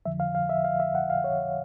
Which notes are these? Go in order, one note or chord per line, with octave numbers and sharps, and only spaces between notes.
F2 D3 F3 E5
F5
F5
E5
F5
E5
F#5
F5
C#5